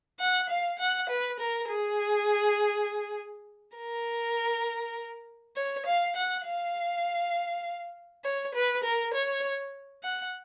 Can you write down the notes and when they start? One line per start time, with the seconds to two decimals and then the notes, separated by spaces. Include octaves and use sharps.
0.20 F#5
0.50 F5
0.79 F#5
1.09 B4
1.40 A#4
1.69 G#4
3.77 A#4
5.56 C#5
5.86 F5
6.16 F#5
6.45 F5
8.24 C#5
8.55 B4
8.84 A#4
9.14 C#5
10.03 F#5